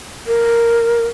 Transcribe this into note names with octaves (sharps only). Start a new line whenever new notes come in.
A#4